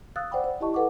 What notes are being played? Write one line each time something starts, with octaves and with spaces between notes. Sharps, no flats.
F5 D#6 E6 F#6 A6
C5 D5 F#5 G5 B5 D6
C5
E4 G4 D#5 A5 C#6
A4 B4 F#5 G5 D6